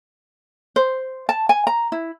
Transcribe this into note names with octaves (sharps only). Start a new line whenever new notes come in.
C5
A5
G#5
A#5
E4